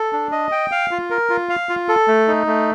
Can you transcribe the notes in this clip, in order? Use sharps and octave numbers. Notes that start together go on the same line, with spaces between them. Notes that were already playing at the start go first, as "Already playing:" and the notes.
Already playing: A4
D4
D#5
G5
F5
F4
A#4
F4
F5
F4
A4
A3
D#4
A3